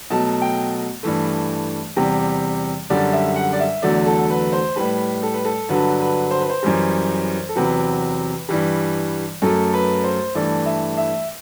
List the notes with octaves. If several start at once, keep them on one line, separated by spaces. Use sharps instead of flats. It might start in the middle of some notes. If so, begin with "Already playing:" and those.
B2 F#3 A3 A5
G5
G2 E3 A3
E2 C3 G3
F#2 D3 G3 D5
E5
F#5
D5
E5
E2 D3 F#3 A3 D5
A4
B4
C5
A2 G3 B4
A4
B4
A4
G2 D3 F#3 B4
B4
C5
B4
C5
F#2 E3 G3
A4
E2 C3 F#3 B4
G2 E3 G3
F#2 F#3 A3 A4
B4
C5
G2 E3 A3 D5
E5
E5